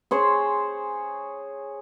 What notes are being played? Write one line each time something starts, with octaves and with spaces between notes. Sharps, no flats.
G#4 C5 C#5